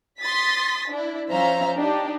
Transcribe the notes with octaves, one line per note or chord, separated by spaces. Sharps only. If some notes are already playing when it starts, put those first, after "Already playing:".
C6 D#6 A6 B6
D4 E4
F3 C#4 C5 E5 F5 A#5
D4 D#4 G4